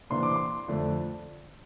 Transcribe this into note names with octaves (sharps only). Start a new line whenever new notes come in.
C3 E3 A#3 D4 C6
D6
C6
F2 D3 A3 D4